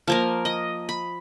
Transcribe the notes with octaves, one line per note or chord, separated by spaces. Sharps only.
F3 A#3 A#4
D#5
B5